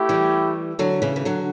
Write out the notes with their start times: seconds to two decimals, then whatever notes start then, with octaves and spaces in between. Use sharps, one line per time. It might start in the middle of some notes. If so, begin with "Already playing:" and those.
Already playing: A3 E4 G4
0.09 E3 G3
0.79 D3 F#3
1.02 C#3 E3
1.16 E3
1.25 D3 F#3